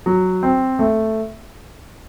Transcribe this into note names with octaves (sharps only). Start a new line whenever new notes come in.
F#3
C4
A3